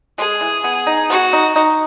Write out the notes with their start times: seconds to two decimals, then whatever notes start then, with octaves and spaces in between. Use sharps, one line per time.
0.18 G#3 G#4
0.41 E3
0.64 B3
0.87 D#4
1.10 B3 F#4
1.33 D#4
1.56 D#4